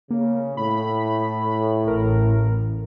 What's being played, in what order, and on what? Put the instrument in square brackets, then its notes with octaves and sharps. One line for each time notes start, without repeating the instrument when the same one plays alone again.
[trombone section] C#3 [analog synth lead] A#3
[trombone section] A2 [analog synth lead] B5
[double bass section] A1 [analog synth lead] A#4